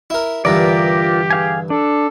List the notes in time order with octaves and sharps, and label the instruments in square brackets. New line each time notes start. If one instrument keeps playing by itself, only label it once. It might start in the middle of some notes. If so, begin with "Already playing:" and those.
[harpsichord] E4 A#4
[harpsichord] G2 D3 E3 [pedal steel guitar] F4 A#4 D5 [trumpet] G4
[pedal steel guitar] G#4 F5 G#5
[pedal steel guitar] D4 [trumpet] A4